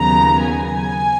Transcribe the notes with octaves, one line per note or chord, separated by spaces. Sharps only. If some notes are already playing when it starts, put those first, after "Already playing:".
Already playing: D#2 C#3 F#3 B3 A#5
G#5